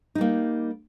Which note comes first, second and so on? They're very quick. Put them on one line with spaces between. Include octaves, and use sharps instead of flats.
D#4 G3 A#3